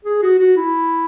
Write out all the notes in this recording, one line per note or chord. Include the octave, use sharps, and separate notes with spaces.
G#4
F#4
F#4
E4